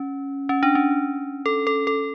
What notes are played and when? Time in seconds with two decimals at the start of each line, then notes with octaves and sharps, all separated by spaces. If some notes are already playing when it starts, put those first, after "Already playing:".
Already playing: C#4
0.49 C#4
0.63 D4
0.75 C#4
1.46 A4
1.67 A4
1.87 A4